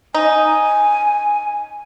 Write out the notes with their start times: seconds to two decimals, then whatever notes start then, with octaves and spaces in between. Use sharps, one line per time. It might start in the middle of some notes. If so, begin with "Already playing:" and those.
0.14 D#4 G#5